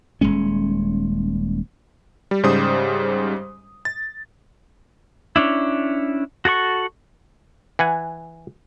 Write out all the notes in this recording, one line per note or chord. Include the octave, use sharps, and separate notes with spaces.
D#1 D#2 G#3 C#4
G3
G#2 C#3 G3 C5 D#6
A6
C#4 D4 E4
F#4 A4 F#5 C#6
E3 F#5 G#5